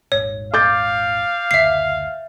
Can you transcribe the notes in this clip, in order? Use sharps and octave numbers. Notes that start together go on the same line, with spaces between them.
D#1 G#1 G#2 C#5
F5 D6 G6 A6
F#1 D2 E5 C7